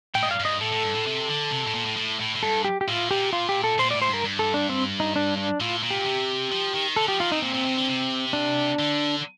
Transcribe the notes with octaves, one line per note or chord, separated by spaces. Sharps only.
A2 G5
G2 D#5
F5
G2 D#5
A2 A4
A2
G2
A2
C3
D3
C3
A2
A#2
A2
A2
A2
A2
G2 A4
G4
G4
A2 F4
A#2 G4
F4
G4
A4
A#2 C5
A2 D5
C5
G2 A#4
G2
A4
D4
C4
D#4
D4
D4
A2 F4
A#2
G4
C3
F3
D#3
D3 A4
F3 G4
D#3 F4
C3 D#4
A#2 C4
A#2
C3
D3
C3
D4
D3